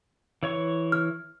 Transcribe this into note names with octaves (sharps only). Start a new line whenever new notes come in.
E3 C#5 C#6
F6